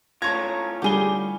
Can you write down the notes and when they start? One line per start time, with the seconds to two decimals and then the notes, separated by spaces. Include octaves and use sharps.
0.22 A2 C#4 F4 A4 C#5 A#5 G#6
0.82 D3 G3 G4 G#4 G7